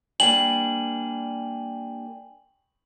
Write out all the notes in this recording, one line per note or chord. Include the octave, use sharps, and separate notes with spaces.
G3 A#3 D4 G5 G#5 F#7